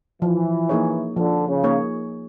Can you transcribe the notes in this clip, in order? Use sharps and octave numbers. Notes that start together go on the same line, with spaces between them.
E3 F3
A#3 D#4 G#4 C#5
D3 F3
C#3
A#3 D#4 G#4 C#5